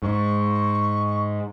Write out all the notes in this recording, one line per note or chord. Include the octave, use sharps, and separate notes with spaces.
G#2 C#6